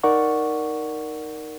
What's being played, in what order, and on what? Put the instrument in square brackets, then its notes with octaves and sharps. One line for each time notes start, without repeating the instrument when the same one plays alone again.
[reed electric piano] D#4 A#4 D5 F#5 C#6